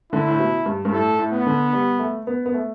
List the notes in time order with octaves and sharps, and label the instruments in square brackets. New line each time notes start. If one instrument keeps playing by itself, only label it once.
[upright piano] D3 [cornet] E4
[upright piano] A2
B2
G2
G2
[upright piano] A2 [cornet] A4
[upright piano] A2
[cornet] B3
[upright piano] D3
G3
A3
B3
B3
A3